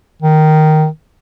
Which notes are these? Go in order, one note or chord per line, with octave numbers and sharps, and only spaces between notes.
D#3